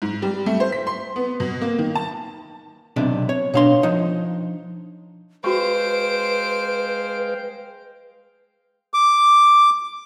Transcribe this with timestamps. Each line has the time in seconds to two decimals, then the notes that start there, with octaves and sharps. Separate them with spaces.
0.02 G#2
0.22 G3
0.46 A3
0.60 C5
0.72 B6
0.87 C6
1.16 B3
1.40 B2
1.61 A#3
1.79 D#3
1.95 A5
2.96 B1 C3 D4
3.29 C#5
3.54 B2 D4 C#5 F5 C6
3.83 F3 D#4
5.44 G#3 F#4 B4 C5 F5 G5 C#6 D7
8.94 D6